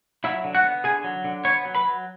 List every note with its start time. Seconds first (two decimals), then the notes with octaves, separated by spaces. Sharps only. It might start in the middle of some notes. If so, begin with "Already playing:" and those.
0.24 F#3 E4 E5
0.44 D3
0.55 F#4 F#5
0.64 B3
0.84 D3 G#4 G#5
1.04 F#3
1.24 D3
1.45 B3 C#5 C#6
1.65 F#3
1.75 B4 B5
1.85 F#3